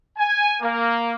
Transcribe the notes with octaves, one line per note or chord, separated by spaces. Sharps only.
G#5
A#3